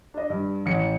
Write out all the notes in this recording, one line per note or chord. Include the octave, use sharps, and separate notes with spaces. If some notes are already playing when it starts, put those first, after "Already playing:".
D4 D#5
G2
A1 C#7